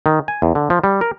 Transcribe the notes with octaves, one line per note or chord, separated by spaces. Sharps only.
D#3
G#5
E2
D3
F3
G3
A#4